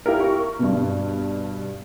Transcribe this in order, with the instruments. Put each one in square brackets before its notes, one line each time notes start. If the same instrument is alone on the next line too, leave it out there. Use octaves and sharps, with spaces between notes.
[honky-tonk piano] E4 F4 G4 A#4
C#6
G2 B2